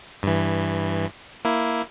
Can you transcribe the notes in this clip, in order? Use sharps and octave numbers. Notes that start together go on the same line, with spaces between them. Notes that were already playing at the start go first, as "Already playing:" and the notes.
G2 E3
A#3 E4